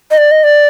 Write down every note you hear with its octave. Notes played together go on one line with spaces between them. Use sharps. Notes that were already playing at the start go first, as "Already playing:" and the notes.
D#5
D5
D#5
D5